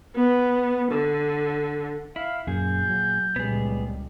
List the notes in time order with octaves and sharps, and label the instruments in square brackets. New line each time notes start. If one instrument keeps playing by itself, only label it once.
[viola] B3
D3
[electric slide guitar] E4 [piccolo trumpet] F5
[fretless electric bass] F#2 [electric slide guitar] A#2 G#4 [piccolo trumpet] G6
[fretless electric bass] F#3
[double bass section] C#2 A#2 G3 [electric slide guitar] B3 G#4